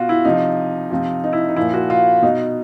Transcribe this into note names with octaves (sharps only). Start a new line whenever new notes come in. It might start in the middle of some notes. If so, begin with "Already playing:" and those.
Already playing: B2 F4 F#4
E4
C3 F3 D#4
C3 F3
D#4
E4
D#4
A#2 F3 E4
F#4
F4
B2 D#4